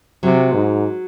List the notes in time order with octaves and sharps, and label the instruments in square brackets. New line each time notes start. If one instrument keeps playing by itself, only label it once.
[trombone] C3 [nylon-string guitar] F#3
[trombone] G#2